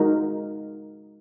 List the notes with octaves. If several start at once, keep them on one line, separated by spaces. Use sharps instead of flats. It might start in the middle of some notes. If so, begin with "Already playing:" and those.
Already playing: G#3 D#4 F#4 A#4